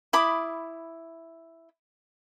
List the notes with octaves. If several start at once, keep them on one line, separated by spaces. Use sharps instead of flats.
E4 B5 D6 D#6